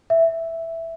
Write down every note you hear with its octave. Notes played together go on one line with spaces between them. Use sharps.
E5